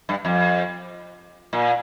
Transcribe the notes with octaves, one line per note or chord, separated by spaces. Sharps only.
G2
F2
A#2